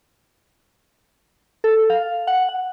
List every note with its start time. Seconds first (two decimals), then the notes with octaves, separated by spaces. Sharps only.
1.64 A4
1.90 F5
2.27 F#5
2.49 F#5